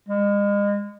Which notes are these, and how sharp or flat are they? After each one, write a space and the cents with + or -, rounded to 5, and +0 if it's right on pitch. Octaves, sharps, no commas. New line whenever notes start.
G#3 -35